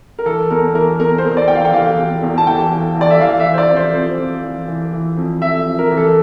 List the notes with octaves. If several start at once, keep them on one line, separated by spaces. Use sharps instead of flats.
A#4
E3 A4
E2 A#4
E3 A#4
E2 A#4
C5
E2
D5
E3 G5
F5
G5
E3 F5
E2
E2
A5
E3 G5
E3
E3 D5
E5
E3 F5
E5
E3
C5
D5
F2
C5
F2 C5
F2
E3
E3
E3
F2
F2 E5
F2
A#4
E3
A4